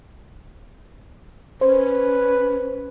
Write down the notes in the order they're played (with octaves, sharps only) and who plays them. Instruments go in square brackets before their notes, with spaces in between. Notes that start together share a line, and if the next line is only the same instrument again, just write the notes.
[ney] C#4 [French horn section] B4 [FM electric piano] C5